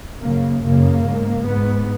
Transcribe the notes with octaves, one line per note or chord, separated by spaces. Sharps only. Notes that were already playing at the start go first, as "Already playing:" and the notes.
F#2 C#3 A#3
F#2 C#3 A#3
G#2
G#2 B3